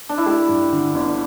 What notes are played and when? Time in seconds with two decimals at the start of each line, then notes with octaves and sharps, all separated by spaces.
0.09 D4
0.18 E4
0.26 A3 G4
0.49 G2
0.73 D3
0.95 G1